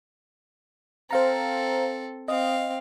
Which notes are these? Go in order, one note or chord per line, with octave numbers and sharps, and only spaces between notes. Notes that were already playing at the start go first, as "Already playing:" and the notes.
C4 A4 C5 F5 A#5
C4 D#5 F5